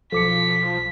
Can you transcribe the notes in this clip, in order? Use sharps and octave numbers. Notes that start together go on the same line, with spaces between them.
B1 F3 A4 D6 B6 C#7